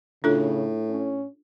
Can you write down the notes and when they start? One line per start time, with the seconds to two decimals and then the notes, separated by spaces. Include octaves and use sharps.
0.24 A2 C#3 D4 F4 A4
0.90 C#4